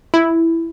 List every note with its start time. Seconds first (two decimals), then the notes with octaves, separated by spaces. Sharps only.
0.14 E4